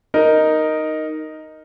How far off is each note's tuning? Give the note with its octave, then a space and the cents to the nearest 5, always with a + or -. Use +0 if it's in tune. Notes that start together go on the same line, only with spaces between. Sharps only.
D#4 +0 A#4 +0